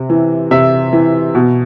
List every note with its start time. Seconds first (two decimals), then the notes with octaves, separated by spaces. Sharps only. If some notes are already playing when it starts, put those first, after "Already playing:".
Already playing: C3
0.10 E3
0.51 C3 E5
0.93 E3
1.35 B2